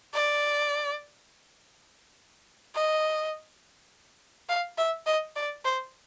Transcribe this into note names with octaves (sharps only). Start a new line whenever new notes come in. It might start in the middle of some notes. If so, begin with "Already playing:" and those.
D5
D#5
F5
E5
D#5
D5
C5